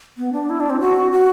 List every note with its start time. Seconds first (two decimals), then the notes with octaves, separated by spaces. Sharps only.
0.18 B3
0.33 D4
0.49 E4
0.60 D4
0.70 C4
0.80 F#4
1.12 F#4